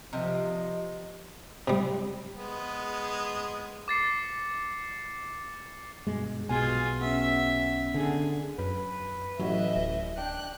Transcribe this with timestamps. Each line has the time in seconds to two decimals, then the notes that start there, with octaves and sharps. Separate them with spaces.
0.13 C3 D#3 F3 G3 A#3 D#5
1.68 C3 G3
2.35 G#3 B3
3.88 D6 A6 C7 C#7
6.07 G2 B2 G#3
6.49 B1 B2 F4 G#4 G#5
7.01 B3 C#4 E5
7.94 D3 G#4
8.59 F#2 B4
9.40 A1 F#3 D#5 E5
9.76 D1
10.18 D4 G5 F#6